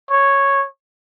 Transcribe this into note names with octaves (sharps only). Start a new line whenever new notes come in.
C#5